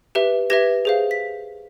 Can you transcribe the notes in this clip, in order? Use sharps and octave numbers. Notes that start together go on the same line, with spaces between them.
G4 B4 E5
G4 B4 E5 G#6 A#6
G#4 C5 F5
B6